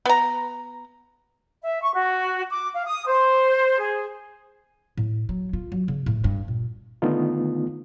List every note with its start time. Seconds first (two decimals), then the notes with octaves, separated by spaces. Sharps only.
0.06 B3 A#5
1.63 E5
1.82 C#6
1.93 F#4
2.50 D6
2.74 F5
2.86 D#6
3.06 C5
3.78 G#4
4.97 A2
5.29 F#3
5.53 F4
5.72 F#3
5.88 C#3
6.06 A2
6.24 G2
6.48 A#2
7.02 D3 D#3 A3 B3 D#4 F4